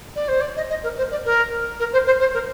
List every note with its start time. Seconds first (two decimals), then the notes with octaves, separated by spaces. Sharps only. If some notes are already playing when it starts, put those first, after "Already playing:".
0.15 D5
0.28 C5
0.40 D5
0.56 D#5
0.69 D#5
0.83 A#4
0.97 C5
1.11 D5
1.24 A#4
1.79 A#4
1.92 C5
2.06 C5
2.19 C5
2.33 A#4